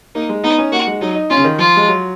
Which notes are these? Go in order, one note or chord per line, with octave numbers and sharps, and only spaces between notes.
A#3 D#4
G#3
B3 D#4
C#4
A#3 F#4
G#3
F#3 D#4
D#4
C#4 F4
C#3
D#3
F3 F4
G#3
F#3